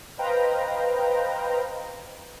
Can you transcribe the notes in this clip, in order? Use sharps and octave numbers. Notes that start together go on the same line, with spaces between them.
B4 C5 D#5 F5 G5 A#5